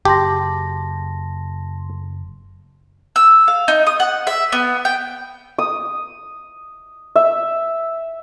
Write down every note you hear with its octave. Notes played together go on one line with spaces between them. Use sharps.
F#1 G4 A5 C6 A#6
E6
F5
D#4
D#6
F#5
E5
B3
G5
D#6
E5